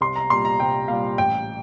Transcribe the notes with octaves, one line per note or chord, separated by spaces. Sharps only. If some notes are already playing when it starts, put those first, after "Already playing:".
C2 C6
A#5
A#2 G3 C6
A#5
C2 G5
A#2 G3 F5
A1 G5